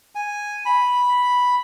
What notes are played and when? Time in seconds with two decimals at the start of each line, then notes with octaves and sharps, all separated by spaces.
0.15 G#5
0.66 B5